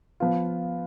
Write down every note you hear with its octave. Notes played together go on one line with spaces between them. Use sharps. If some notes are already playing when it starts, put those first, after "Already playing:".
F3 B3 F4